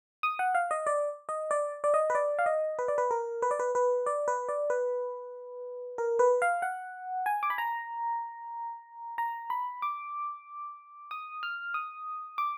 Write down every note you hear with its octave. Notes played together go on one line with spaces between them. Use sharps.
D#6
F#5
F5
D#5
D5
D#5
D5
D5
D#5
B4
D5
F5
D#5
B4
D5
B4
A#4
B4
D5
B4
B4
D5
B4
D5
B4
A#4
B4
F5
F#5
G#5
D6
B5
A#5
A#5
B5
D6
D#6
F6
D#6
D6